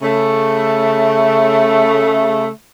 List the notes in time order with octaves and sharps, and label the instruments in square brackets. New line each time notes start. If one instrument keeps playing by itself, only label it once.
[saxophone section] C#3 A3